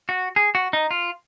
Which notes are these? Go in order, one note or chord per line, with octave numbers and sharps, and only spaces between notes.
F#4
G#4
F#4
D#4
F4